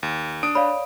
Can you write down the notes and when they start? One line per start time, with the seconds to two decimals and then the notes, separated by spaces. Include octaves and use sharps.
0.03 D#2
0.43 D4 D#6 D7
0.55 C#5 D5 F5 B5